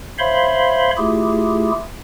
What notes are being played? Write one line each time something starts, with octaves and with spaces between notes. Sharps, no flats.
C5 C#5 E5 F5 B5 C6
A3 E4 F4 G4 G#4